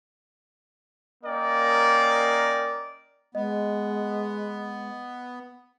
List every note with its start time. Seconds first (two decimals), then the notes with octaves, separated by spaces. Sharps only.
1.24 A#3 C#4 A#4 D5 D#5 G5
3.35 G#3 B3 D#5